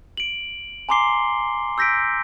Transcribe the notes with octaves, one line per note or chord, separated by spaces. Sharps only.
D7 F#7
G#5 A#5 C6 D6 C7 G7
E6 G6 A#6 B6 D7